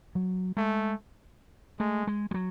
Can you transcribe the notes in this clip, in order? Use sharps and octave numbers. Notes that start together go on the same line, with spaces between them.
F#3
G#3 A3
G#3 A3
G#3
G3
F#3